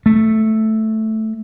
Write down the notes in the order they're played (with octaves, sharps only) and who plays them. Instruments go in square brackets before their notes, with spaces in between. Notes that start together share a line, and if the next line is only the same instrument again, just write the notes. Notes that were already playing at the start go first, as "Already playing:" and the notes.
[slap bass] A3